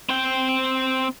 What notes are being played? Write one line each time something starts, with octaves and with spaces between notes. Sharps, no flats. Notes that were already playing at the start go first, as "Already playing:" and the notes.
C4 G5